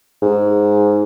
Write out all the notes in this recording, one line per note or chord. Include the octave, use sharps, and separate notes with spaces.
G#2